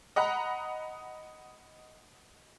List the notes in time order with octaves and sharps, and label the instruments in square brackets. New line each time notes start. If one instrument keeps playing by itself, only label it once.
[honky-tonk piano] D#5 F#5 A#5 B5